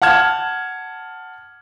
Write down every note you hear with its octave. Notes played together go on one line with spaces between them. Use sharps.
F#5 A5 F6 G#6 E7